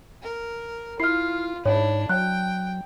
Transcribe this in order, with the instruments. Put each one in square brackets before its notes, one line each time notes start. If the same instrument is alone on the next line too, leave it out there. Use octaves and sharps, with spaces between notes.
[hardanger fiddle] A#4
[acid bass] E4 [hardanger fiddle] F4 [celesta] F6 C7
[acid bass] G#2 [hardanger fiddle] D4 E4 [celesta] C#5
[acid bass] F#3 [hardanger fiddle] G5 [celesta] F#6